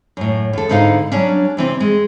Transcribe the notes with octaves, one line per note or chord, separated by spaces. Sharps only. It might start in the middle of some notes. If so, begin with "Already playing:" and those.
F#2 A2
D#2 A4
G#2 D3 D#4 E4 F5
F#3 G3 C#4 D4
C3 E3 C4
G#3